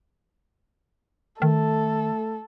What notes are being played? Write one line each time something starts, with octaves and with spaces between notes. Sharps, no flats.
D#3 A3 A4